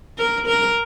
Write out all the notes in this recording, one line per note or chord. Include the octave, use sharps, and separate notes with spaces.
A#4
A#4